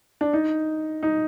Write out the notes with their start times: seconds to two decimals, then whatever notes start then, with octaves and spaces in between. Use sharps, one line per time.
0.21 D4
0.33 D#4
1.03 D#4